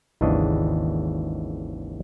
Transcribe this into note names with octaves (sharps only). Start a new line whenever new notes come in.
G#1 D#2 C#3 E3 D4 D#5